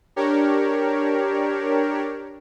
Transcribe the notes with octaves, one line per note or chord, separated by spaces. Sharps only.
D4 G4 A#4 C#5